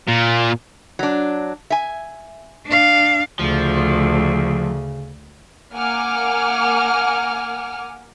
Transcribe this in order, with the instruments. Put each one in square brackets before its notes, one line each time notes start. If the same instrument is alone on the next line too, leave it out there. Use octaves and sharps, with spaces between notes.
[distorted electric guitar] A#2
[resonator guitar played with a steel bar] F#3 D4
E5 G#5
[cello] D4 F5
[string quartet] D2 [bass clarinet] C#3 [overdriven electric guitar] F3
[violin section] A#3 F#5 G#5 D6 F6